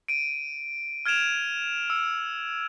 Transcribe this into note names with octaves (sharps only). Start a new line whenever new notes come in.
D7 D#7
F6 G#6 D7 E7 F7
E6